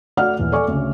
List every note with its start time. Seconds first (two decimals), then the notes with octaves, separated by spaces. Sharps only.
0.17 A3 F#4 D5 F#5 F6
0.39 D#1 E3
0.52 A4 D5 G#5 C#6 D6
0.68 D2 C#3